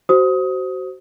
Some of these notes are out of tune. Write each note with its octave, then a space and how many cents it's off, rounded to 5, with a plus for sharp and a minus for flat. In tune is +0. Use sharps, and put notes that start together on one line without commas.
F#4 +25 C5 +0 D#6 +20